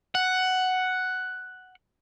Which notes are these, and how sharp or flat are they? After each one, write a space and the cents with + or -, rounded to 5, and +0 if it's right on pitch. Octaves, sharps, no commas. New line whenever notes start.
F#5 +5